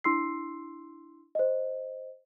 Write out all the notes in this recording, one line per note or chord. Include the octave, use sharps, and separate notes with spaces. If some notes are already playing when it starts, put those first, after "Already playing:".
D4 E4 C6 E6 C7
C5 D#5